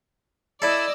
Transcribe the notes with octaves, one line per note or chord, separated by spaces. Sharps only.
E4 A4 D5 D#5 E6